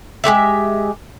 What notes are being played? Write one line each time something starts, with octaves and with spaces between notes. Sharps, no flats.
G#3 F#4 G4 E5